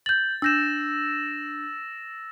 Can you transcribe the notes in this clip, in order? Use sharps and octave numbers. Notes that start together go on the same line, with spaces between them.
G6 A6 F#7
D4 E6 G6 A#6 E7